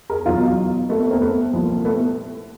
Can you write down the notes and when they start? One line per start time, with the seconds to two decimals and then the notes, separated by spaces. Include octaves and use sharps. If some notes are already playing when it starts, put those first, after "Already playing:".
0.10 G#4 A#4
0.25 E2 B2 F#3 D#4 F4
0.89 A3 B3
1.00 A3 B3
1.11 A#3 C4
1.21 A3 B3
1.53 C2 A#2 F3
1.85 A3 B3